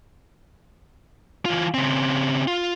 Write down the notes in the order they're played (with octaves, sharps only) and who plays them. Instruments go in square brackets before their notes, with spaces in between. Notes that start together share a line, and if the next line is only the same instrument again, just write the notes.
[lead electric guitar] E3 F4
C#3 C4
F4